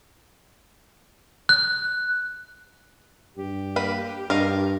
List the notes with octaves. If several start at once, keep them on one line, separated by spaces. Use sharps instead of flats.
F#6
G2 G4
A#3 B4
G2 A#4 D#5 F5